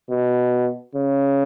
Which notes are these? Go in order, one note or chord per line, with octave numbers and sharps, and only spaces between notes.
B2
C#3